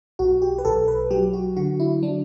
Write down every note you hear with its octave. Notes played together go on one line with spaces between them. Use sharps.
B1 F#4
G4
B4
B1 A4
B4
F#3 G4
F#4
D3 F#4
E4
F#3 D4